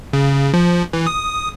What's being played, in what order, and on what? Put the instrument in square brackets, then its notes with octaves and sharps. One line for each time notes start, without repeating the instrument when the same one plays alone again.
[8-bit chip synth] C#3
F3
E3
D#6